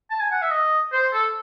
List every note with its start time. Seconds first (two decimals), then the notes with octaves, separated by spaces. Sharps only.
0.11 A5
0.21 G#5
0.31 F#5
0.42 E5
0.51 D#5
0.92 C5
1.13 A4